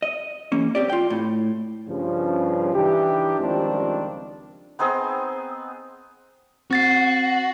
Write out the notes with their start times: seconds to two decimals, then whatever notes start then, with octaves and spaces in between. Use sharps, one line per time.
0.02 D#5
0.52 E2 A#3 C#4
0.75 C4 G4 D5
0.90 F4 G5
1.10 A2
1.88 G2 C#3 F3
2.73 E3 D4 D#4 G4
3.40 C#2 D#3 F3 G3 C4 D4
4.79 B3 C4 D#4 G#4
6.71 C4 F#4 A6 C7